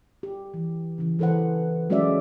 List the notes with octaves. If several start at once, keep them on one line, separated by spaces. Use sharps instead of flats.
G4
E3
C#3 E3
E3 A4 B4 C5 F#5
F#3 G#3 C#4 F#4 D5 E5